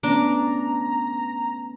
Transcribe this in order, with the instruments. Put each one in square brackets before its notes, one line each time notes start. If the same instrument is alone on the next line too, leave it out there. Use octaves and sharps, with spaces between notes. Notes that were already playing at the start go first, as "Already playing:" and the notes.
[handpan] A3 B3 C#4 [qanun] D4 [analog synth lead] A#5